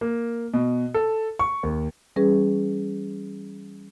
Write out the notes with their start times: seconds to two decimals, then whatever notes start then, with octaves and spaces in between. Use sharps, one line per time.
0.01 A#3
0.54 B2
0.94 A4
1.39 C#6
1.63 D#2
2.16 E3 G3 C#4 G#4 B4